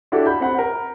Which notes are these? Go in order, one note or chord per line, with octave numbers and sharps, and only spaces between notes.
D4 E4 F#4 G4 A4 D5
B5 G6
C4 F#5 B5
A#4